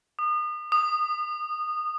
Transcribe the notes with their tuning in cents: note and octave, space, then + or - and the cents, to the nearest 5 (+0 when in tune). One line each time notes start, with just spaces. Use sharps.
D#6 -35
D#6 -20